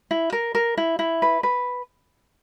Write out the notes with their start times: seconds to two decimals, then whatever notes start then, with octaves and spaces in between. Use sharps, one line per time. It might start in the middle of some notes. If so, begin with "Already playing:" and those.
0.11 E4
0.32 A#4
0.55 A#4
0.77 E4
0.99 E4
1.22 B4
1.43 B4